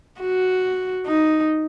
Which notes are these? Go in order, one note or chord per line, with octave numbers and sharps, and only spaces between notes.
F#4
D#4